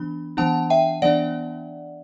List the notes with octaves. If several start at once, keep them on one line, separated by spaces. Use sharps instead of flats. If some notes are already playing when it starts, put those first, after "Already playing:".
Already playing: E3 B3 D4 B5
E3 B3 D4 F#5 A5
E5 G5
E3 B3 D4 D5 F#5